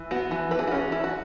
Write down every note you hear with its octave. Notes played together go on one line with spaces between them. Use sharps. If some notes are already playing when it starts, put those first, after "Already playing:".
Already playing: E3
B3 F#4
E3
E3 B4
G#4
F#4
C#4 G#4
E3 E4
F#4